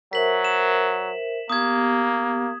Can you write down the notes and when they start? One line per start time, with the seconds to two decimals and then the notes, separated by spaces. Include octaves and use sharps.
0.13 F#3 A#4 C5 E5 B6 F#7
0.45 E7
1.50 A#3 B3 G4 D#6 G#6